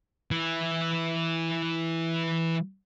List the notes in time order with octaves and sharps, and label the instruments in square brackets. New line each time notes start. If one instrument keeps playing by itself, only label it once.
[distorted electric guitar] E3 E4